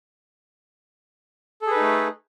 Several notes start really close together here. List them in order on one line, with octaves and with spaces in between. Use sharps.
A4 G#4 B4 D#4 A3